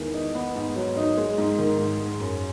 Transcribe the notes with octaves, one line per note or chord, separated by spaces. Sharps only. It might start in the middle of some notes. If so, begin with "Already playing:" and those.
Already playing: E2 D#3 G#3
D#4
B3
G#2
F#3
D#4
G#3
G#2
D#3
G#2
G#3
F#2